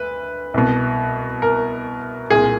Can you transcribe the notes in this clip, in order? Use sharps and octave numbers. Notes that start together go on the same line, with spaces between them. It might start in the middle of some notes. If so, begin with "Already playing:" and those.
Already playing: D2 B4
C2 B2
A#4
C2 A#2 G#4